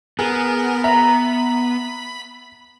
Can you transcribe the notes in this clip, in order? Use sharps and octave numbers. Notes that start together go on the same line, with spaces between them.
B3 G#4 A#4
E5 A#5 B5